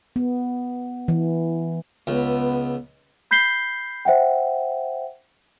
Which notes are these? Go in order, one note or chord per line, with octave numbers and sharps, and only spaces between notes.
B3
E3
C#2 B3
B5 G6 B6 C7 G7
C5 E5 F#5 G5